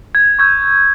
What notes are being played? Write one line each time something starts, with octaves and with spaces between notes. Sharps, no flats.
G#6
C#6 E6 G6 G#6